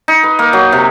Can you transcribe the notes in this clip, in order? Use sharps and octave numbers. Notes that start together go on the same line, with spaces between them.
D#4
B4
A#3
F#3
C3